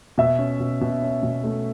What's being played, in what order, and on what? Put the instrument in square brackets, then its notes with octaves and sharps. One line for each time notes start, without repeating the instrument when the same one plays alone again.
[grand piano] B2 [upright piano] E5
[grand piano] C#4
B2
B2
C#4
B2
A3